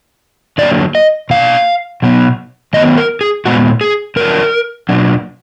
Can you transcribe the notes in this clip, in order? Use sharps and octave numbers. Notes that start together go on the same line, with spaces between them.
D3 F#3 A#3 D5
D#5
B2 A#3 D4 F5
B2 F#3 B3
D#3 F#3 B3 D#5
A#4
G#4
A#2 G#3 B3 F#4
G#4
D3 F#3 D4 A#4
B2 F#3 D4